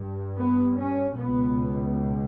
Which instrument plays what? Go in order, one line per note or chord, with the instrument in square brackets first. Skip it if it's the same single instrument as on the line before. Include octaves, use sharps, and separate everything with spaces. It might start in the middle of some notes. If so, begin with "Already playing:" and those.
Already playing: [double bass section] G2
B3
C#4
C#2 B2 B3